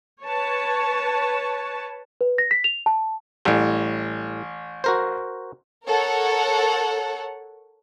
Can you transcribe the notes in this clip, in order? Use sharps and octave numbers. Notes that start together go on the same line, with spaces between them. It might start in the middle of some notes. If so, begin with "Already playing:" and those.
B4 C#5 A5
B4
A#6
B6
F7
A5
A1 A2 G3
F#4 A#4 C5
A4 A#4 C#5 F#5